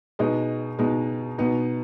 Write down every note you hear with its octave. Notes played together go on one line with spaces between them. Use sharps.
B2 G#3 B3 D#4 D#5
B2 G#3 B3 D#4
B2 B3 D#4